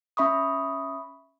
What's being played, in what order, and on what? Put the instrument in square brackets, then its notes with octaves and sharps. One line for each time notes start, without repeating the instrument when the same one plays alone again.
[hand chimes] C#4 E5 B5 C#6 D#6